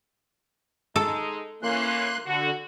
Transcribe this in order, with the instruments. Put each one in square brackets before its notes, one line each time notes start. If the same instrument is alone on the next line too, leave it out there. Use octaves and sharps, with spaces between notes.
[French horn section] G#3 D#4 [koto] A4
[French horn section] E3 C#4 [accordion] A#3 C6 F#6
[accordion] D3 [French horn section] F#4